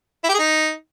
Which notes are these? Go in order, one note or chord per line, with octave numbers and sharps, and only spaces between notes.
E4
G4
G#4
D#4